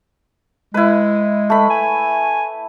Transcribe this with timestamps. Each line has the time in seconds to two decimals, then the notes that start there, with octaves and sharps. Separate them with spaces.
0.74 G#3 E4 B4
1.50 A3 B5
1.70 G#5